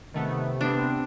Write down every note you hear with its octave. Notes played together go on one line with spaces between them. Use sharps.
C3 D#3 A3 B3
B3 C4 D4